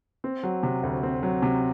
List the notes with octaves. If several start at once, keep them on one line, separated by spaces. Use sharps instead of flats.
C4
F#3
C3
D2
C4
F#3
C3